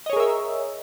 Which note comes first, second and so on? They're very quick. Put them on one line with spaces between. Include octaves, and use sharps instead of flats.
D#5 C#5 G#4 A#4 E5